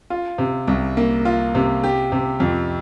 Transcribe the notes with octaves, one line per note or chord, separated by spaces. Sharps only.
F4
C3
C2
A#3
F4
C3
G4
C3
F2